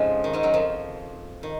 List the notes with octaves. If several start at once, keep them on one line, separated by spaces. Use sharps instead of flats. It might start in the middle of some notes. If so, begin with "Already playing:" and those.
Already playing: F2 G#2 C#3 F3 G#3
D#3
G#2 G#3
F#2 F#3
F2 F3
D#3